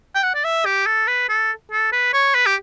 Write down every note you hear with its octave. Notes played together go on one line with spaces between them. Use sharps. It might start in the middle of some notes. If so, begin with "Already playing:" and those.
G5
F#5
D5
E5
G4
A4
B4
A4
A4
B4
C#5
B4
G4